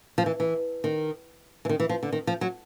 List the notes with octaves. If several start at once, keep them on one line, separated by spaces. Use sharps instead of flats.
F3
E3
E3
D#3
E3
D#3
E3
F3
D3
D#3
F3
F#3